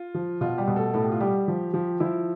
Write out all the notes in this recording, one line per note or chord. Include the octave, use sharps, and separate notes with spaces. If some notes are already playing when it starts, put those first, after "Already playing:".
Already playing: F4
F3
B2 F4
G3 G4
B2
A3 A4
A2 A4
G4
F4
G3 G4
F3
F3
F3 E4